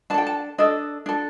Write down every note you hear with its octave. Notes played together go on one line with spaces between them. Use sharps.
D4 A4 G5 A5
A5
D4 A4 D#5
D4 A4